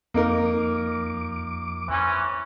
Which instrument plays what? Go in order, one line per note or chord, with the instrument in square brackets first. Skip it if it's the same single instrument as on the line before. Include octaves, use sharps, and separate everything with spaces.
[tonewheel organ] F2 D6 [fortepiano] A#3 D#4 A#4
[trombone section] E3 C4 C#4